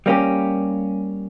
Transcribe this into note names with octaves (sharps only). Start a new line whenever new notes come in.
G3 A#3 C#4 G4